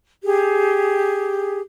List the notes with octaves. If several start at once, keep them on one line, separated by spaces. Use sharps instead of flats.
G4 G#4